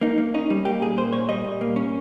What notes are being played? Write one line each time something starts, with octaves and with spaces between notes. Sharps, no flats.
A#3 D#4
A#3
C#4 D#4
G3
A#3 G4
A#2 G#4
A#3 C5
A#2 C#5
G3 D#5
A#2
A#3
C#4